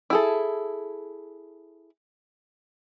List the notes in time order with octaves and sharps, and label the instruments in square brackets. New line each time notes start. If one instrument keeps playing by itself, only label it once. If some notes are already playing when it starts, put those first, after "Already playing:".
[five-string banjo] E4 G#4 A4